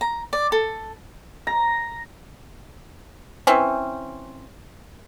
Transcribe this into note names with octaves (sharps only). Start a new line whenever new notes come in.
A#5
D5
A4
A#5
E3 C4 C#4